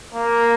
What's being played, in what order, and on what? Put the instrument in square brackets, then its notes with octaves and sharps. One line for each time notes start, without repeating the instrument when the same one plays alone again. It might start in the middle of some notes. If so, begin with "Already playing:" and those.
[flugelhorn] A#3